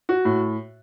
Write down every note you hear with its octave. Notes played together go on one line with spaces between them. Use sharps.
F#4
A2